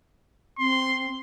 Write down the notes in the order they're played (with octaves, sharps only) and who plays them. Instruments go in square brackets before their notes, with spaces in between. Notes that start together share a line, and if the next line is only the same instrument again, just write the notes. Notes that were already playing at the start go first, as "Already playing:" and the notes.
[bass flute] C4 [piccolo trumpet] C6